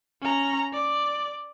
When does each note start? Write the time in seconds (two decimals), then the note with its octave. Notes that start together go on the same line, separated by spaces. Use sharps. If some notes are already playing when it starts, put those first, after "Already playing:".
0.22 C#4 A#5
0.73 D5